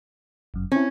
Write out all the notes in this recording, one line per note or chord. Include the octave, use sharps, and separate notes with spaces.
G1 F#2
C4 C#4 E4